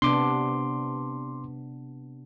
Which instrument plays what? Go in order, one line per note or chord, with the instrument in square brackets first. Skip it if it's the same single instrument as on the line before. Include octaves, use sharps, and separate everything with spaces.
[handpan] C3 B3 D4 [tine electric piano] C6 D6